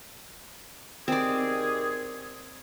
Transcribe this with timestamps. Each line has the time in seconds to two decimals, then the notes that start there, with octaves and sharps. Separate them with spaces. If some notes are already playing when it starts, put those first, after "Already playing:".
1.08 D#3 C4 G4 G#4 D5